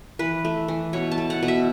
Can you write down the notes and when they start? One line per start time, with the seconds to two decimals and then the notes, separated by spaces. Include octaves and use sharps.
0.19 E3 B4
0.45 A3
0.68 E3
0.93 B2 C#5
1.12 A5
1.18 A3
1.30 F#5
1.43 B2
1.48 E5